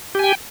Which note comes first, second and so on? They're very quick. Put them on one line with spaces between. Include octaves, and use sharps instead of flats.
G4 G#5 G5